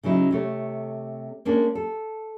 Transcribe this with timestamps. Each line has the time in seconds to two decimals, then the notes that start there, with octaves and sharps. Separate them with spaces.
0.03 C#3 F#3 D#4 E4
0.31 C3 A3 C#5
1.45 G#3 A#3 C#4 D4
1.75 A4